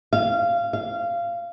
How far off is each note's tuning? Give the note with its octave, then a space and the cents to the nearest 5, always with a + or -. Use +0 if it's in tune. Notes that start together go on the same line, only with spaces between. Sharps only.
F5 -20
F5 -20